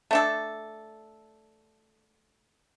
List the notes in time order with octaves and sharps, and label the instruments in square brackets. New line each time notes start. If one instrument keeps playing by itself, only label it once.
[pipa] A3 D4 A4